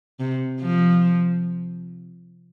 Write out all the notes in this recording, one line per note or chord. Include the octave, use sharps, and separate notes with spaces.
C3
F3